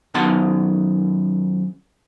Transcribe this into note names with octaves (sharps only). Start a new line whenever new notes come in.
F#2 D#3 B3 F#5 A5 C6